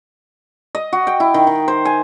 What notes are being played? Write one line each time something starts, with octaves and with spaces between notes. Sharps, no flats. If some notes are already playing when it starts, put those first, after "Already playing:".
D#5
F#4
G5
E4
D#3
D#3
C5
G#5